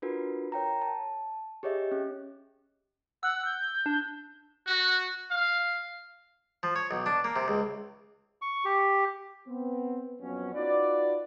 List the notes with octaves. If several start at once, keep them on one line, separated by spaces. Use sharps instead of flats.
D4 F4 F#4 A#4 B4
A#4 C#5 G5 A#5
A5
G4 G#4 C#5 D#5 E5
C#4
F#5 E6
G6
D4
F#4
F5
F3
C#5
B1
D4
A#3
C3
C#2
C#6
G4
B3 C4
F2 F#3 B3 C#4
D#4 F4 F#4 B4 D5